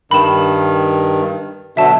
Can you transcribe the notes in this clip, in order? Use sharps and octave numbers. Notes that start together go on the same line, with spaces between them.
G2 D#3 B5 E7
B2 D3 F#3 E5 A5